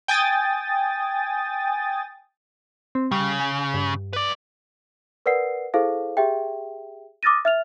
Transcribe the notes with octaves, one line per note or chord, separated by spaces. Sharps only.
G5 G#5 D#6 A6
C4
C#3 G3
G#5
G2
B4 D5
A#4 B4 D5 F#5 C7
E4 G#4 A4 C5 F5
G4 G#4 E5 G5
D6 D#6 F6 A6 A#6 D#7
E5 F6 F7